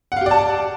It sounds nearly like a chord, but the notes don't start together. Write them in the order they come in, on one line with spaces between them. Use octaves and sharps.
F#5 F5 G4 D5 A5